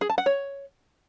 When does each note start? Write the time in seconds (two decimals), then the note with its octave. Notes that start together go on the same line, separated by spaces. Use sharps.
0.01 G#4
0.10 A5
0.18 F#5
0.26 C#5